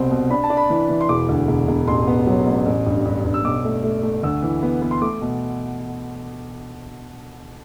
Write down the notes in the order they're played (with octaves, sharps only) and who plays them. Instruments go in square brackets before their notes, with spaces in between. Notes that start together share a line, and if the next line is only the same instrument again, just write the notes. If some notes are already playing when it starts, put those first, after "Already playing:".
Already playing: [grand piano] C2 B2 C4
B2
D4 B5
A5
D4
B5
E3
E3
C6
E1 D6
D2
E1
E1
A1 C6
B3
F#3
A1
A1
G2
G2
G2
E6
B1 D6
A3
A3
A3
D2 E6
E3
B3
B3
C6
A3 D6
B2